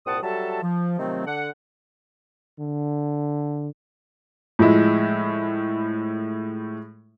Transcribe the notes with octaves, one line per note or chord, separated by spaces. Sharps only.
C2 A#2 C4 F#5 A5 D#6
F#3 G3 F#4 A4 E5 A5
F3
C3 D#3 F3 F#3 A3 C4
D3 F#5
D3
A2 F3 G#3 E4